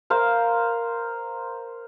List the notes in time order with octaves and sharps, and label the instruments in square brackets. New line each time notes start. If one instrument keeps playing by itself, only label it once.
[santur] A#4 C5 F5